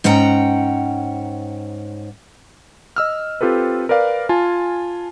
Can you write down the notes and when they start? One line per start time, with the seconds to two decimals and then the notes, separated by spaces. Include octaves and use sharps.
0.04 G#2 C#4 F#5 G5 A#5
2.96 D#5 E6 F6
3.41 C4 F4 G4 A4 B4
3.89 A#4 B4 D5 F5
4.29 F4 G#5 A5